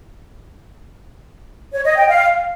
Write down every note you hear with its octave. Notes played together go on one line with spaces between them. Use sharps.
C#5
D#5
G5
F5